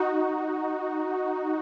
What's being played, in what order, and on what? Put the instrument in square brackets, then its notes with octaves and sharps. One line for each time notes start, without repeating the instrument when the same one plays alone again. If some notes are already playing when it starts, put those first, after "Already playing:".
Already playing: [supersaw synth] D#4 F#4